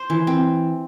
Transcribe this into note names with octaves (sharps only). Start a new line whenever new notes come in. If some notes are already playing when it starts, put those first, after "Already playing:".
Already playing: C5
E3
C4